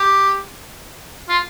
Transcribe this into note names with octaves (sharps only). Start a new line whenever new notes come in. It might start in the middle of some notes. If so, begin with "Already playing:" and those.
Already playing: G4
F4